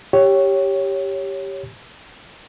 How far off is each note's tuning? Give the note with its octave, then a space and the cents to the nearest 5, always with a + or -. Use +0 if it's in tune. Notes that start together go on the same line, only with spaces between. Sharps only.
G4 +0 C#5 +0